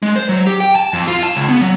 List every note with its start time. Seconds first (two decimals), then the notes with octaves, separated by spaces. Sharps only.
0.03 G#3
0.16 C5
0.29 F#3
0.47 G4
0.60 G5
0.76 A5
0.93 F2
1.07 F4
1.23 A5
1.35 C#2
1.49 B3
1.61 F#3